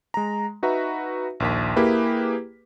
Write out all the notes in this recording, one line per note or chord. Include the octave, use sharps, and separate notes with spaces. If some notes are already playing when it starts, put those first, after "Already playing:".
G#3 A#5
D#4 F#4 B4 E5 A#5
A#1 D#2 B6
A#3 E4 G4 G#4 B4